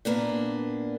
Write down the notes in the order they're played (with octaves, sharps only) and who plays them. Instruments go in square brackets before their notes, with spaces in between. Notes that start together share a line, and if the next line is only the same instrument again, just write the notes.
[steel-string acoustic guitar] A#2 A#3 B3 D4